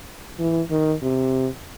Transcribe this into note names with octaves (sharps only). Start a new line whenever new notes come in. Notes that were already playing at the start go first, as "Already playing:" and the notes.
E3
D#3
C3